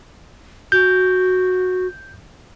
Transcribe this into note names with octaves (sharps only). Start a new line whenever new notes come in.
F#4 G6